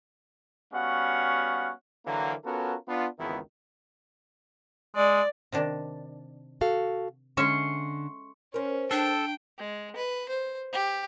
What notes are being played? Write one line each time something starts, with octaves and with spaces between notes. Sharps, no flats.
G3 B3 C#4 F#4 F5 F#5
D3 E3 F#3 A#3
B3 C#4 F4 F#4 A4 A#4
B3 D4 F4
G#1 C#2 D#3 E3 B3 E4
G#3 D5
C3 D#3 D4
F#4 A4 F5
D3 G#3 C#4 E5 C6 C#6
C#4 A#4 C5
D4 A4 G5
G#3
B4
C5
G4